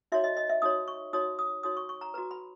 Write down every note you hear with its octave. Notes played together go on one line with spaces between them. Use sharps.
D#4 F#4 C#5 E5
D#5
D#5
E5
D#4 F#4 C#5 D#6
C#6
D#4 F#4 C#5 D#6
D#6
D#4 F#4 C#5 D#6
C#6
C#6
A#5
F#4 B4 A#5
B5